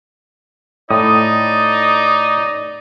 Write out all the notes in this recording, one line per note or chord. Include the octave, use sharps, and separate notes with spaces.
A2 D#4 D5 D#6